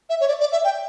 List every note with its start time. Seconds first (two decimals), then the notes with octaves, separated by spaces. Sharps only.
0.10 E5
0.21 C#5
0.28 D5
0.40 D5
0.52 E5
0.64 G5